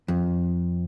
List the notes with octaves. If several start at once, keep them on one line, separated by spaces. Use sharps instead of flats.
F2